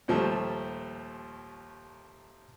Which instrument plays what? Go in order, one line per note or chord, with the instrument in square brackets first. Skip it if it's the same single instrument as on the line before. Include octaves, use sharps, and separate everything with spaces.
[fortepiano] D#2 A#2 F3 G3 A3